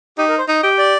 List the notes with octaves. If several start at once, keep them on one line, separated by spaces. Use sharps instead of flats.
D#4 G4
A#4
C5
D#4 D#5
G4
D5